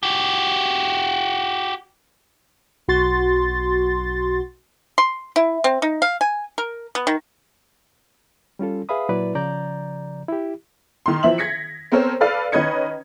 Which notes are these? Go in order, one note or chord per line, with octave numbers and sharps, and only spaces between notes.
F#4 G4
B1 F#4 C6 A6
C6
E4
C4
D#4
F5
G#5
A#4
B3
D#3
G3 C#4 F4 A4
G#4 B4 E5 F5 B5 D#6
A#2 F#3 E4 B4 D5
C#3 F3 D5 A#5 G6
E4 G4
D#3 C6
E3 F3 E4 E5 F#7
G#6 A#6 B6 C#7
B3 C4 A4 A#4 C5 C#5
A4 B4 D5 F5 F6
D#3 C#4 B4 D#5 G#6 C#7